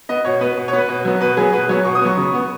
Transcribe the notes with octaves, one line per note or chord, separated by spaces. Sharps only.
B3 D#5
B2 C#5
B3 B4
B2
C#5
B3
B4
B2
F#3 B3
B2 B4
F#3 B3 G#4
B2 B4
F#3 B3 C#5
B2 C#6
D#6
F#3 B3 C#6
C#3
B3